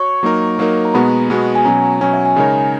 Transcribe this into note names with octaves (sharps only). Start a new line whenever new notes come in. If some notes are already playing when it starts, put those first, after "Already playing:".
Already playing: F#4 C#5 C#6
F#3 A#3 D#4 A#4
F#3 A#3 D#4 A#4
A#5
B2 G#3 B3 F#4 B5
B2 G#3 B3 F#4
G#5
B2 F#3 C#4 A#5
B2 F#3 C#4 G#5
E5
G#5
C#3 G#3 D#4 A#4 C#5